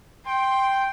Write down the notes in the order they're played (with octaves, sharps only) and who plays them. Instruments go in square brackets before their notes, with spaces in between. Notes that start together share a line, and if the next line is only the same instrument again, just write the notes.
[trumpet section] G5 [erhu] C6